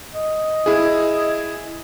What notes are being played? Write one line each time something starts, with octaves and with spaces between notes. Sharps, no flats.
D#5
E4 G#4